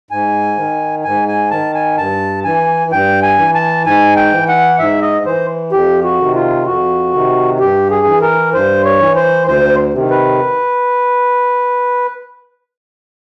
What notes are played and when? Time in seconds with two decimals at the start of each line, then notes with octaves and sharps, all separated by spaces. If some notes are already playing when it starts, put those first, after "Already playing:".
0.11 G#2 G#5
0.57 D#3
1.04 G#2 G#5
1.28 G#5
1.51 D#3 A5
1.75 G#5
1.98 G2 A5
2.44 E3 G#5
2.91 G2 G5
3.23 G#5
3.38 E3
3.55 A5
3.86 G#2 G#5
4.16 G5
4.33 E3
4.48 F#5
4.79 G#2 E5
5.02 D#5
5.25 E3 C5
5.72 F2 G4
6.04 F#4
6.20 C3 D#3
6.35 F4
6.66 F2 F#4
7.14 C3 D#3
7.60 G2 G4
7.91 G#4
8.06 E3
8.22 A#4
8.53 G2 C5
8.84 C#5
9.00 E3
9.15 C5
9.46 D2 C5
9.94 C3 D#3
10.10 B4